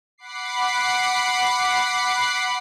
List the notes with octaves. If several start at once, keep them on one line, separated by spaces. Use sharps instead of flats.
F#5 B5 D6 C7